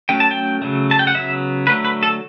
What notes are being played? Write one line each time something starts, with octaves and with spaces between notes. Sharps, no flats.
F#3 A3 C#4 G5
A5
G5
C#3 F#3 A3
A5
G5
F#5
C#3 F#3 B3 E5
D3 F#3 A3 B4
B4
A4